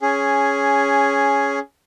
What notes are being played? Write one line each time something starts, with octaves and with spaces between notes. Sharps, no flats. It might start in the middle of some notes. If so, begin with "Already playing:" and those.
C#4 G#4